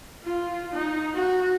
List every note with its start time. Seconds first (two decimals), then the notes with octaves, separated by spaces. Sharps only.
0.24 F4
0.74 D#4
1.14 F#4